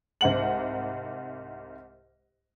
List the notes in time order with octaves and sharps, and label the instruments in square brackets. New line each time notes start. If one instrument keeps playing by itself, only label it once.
[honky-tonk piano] C2 G#2 F#5 F#7